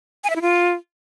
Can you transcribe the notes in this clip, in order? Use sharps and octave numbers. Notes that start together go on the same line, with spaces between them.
G#5
E5
E4
F4